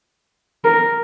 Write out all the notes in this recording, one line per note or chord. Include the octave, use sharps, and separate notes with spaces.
A#4